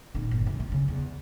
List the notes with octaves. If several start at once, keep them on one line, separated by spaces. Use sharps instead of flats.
A#2 D#3
G1
B2 E3
F4
C#3
E2